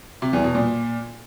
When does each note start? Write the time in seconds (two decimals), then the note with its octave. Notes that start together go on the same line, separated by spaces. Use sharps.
0.22 C3
0.33 E2
0.44 B2
0.55 A#2